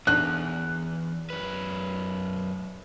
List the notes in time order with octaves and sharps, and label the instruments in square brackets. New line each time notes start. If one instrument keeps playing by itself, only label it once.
[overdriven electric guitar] E2 [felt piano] F#6
[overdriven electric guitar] F#2 B4